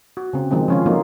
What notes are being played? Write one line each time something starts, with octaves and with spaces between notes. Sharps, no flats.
F#4
C#3 C4
D#3 F3 G#3 C4
F3 C#4 F4
E3 F#3 A#3 D#4 F4 A4